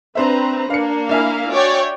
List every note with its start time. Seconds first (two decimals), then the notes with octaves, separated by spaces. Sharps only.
0.15 C4 D4 B4 C5 E5 A#5
0.70 A#3 D4 F5 C#7
1.09 D4 E4 E5 F5 G#5
1.51 F#4 C#5 D5 G5